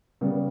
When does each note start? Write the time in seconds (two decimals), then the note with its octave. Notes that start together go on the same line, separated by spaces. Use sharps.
0.21 C#3 G3 B3